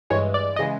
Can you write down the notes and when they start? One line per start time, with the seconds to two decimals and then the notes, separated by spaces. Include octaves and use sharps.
0.10 G2 E3 G#3 C#5
0.34 D5
0.56 D#5
0.59 C#3 E3 G#3